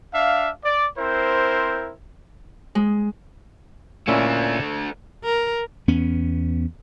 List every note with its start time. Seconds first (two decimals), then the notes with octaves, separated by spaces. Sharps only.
0.14 D4 E5 F5
0.65 D5
0.98 C4 E4 A#4 C5
2.75 G#3
4.08 A#2 A3 C#4 D4 E4
5.25 A#4
5.88 E2 B3 C#4